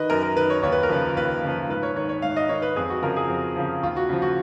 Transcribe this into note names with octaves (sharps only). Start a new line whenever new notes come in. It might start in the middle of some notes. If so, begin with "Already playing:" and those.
Already playing: D#3 B4 D#5
F#2 A#4
A#4
D#3 B4
C#5
D#2 C#5
B4
A#4
C#3 F3 B4
D#2 B4
C#3 F3
G#2 B4
C#5
D#3 C#5
C#5
G#2 F5
D#5
D#3 C#5
B4
F2 G#4
F#4
C#3 F3 A#4
G#4
F2
C#3 F3
D#2 F4
F#4
C#3 F3
F#4